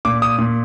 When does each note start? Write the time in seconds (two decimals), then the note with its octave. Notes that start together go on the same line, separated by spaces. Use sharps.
0.05 A#2 D6
0.22 D#6
0.38 A#2